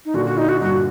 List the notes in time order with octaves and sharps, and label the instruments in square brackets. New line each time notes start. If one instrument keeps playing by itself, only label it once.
[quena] D#4
[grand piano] A#2 D3 [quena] F#4
[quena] F#4
D#4
F#4
[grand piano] G2 A#2 [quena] F#4